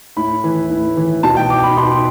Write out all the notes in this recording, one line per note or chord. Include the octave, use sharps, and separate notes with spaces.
A2 B5
E3
A2
E3
B2 A5
G5
D6
B5
B2 C6